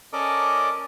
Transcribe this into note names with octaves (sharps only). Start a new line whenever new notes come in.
C#4 A4 A#4 D5 D#5 D6